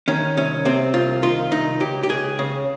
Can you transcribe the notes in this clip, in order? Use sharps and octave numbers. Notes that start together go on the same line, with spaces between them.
D#3 C#4
C2 C#4
C3 C4
C2 F4
D#3 F4
C2 D#4
C#2 G4
G4
C#2 G#4
C#3